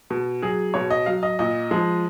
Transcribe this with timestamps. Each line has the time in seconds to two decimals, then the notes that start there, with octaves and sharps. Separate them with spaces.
0.10 B2
0.42 F#3 G#4
0.74 B2 C#5
0.90 D#5
1.06 F#3 F5
1.23 D#5
1.39 A#2 D#5
1.71 F3 G#3